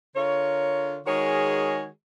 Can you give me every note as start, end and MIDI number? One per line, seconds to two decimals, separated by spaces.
0.16 0.99 50
0.16 0.99 65
0.16 0.99 70
0.16 0.99 73
1.06 1.87 51
1.06 1.87 56
1.06 1.87 66
1.06 1.87 68
1.06 1.87 70
1.06 1.87 73